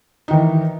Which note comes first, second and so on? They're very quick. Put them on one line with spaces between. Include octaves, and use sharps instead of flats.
D#4 D#3 E3